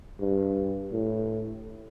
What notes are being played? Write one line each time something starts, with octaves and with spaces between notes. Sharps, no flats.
G2
A2